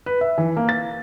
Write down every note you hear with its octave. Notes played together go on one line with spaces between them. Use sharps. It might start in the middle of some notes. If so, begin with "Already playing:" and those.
B4
E5
E3
A#3
A6